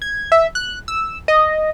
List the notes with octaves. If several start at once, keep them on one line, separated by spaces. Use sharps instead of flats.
G#6
E5
F#6
E6
D#5